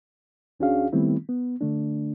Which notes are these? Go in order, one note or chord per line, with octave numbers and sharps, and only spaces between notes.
D2 C#4 D4 F#4 G#4 F5
D#3 G3 A3 B3 C4 E4
B3
D3 A3 D4